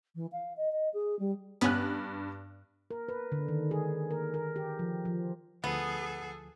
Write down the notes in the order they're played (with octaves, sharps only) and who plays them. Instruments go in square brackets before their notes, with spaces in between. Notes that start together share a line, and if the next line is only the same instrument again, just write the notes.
[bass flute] E3
F5
D#5
D#5
G#4
G3
[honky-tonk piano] G2 F#6 [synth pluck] B3 C#4
[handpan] A#4
B4
D3
D#3
G#4
A#4
A#4
G4
F3
F3
[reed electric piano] D2 F3 [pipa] B3 [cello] G#4 A4